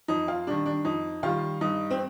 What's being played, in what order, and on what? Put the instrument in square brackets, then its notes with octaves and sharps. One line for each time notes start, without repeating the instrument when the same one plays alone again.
[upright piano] F2 D#4
F4
D#3 G3 D4
D4
F2 D#4
D#3 G3 F4
G2 D#4
C4